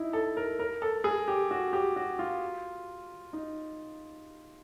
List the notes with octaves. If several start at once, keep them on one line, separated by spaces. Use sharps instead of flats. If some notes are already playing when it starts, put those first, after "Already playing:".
Already playing: D#4 E4
A4
A#4
A#4
A4
G#4
G4
F#4
G4
F#4
F4
D#4